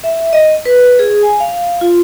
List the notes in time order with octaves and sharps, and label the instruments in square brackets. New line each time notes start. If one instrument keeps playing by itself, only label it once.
[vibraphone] E5
D#5
B4
G#4
G#5
F5
F4